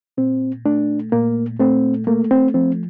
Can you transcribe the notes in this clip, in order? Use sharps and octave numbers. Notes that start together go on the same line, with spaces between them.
A#2 C4
A3 D4
A#2 A#3
A3 C4
A3 A#3
C4
F3 C4